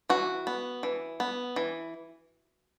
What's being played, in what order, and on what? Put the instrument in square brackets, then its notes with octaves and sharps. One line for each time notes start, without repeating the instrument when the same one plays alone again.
[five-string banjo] E3 F#4
B3
E3
B3
E3